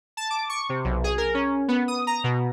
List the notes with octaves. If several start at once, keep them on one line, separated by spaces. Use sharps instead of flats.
A5
D6
C#6
C3
B1
G#4
A#4
C#4
B3
D#6
A#5
B2